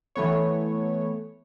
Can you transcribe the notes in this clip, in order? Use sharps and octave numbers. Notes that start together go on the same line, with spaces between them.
E3 A3 B3 C#5